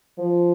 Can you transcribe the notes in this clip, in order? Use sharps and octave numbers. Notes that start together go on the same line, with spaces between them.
F3